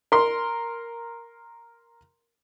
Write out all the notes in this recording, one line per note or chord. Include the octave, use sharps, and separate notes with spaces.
A#4 C6